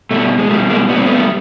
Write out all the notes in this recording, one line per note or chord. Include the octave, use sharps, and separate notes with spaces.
B2 G3 A3
G#3
B2 G3 A3
G#3 A#3
A#2 G3 B3
C4
A3 B3